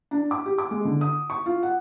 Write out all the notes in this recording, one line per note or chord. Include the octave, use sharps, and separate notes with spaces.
D4
D6
G4
D6
G#3
D3
D#6
C#6
F4
F#5